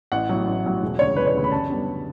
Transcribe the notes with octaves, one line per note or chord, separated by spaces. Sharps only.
A1 F#5
A2 F#3
A1
A2 F#3
E1
D2 C#3 C#5
E1 B4
C#5
D2 C#3
B5
F#2 A5
D3 G3 B3 D4